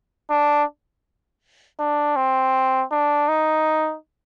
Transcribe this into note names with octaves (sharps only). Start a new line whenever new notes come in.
D4
D4
C4
D4
D#4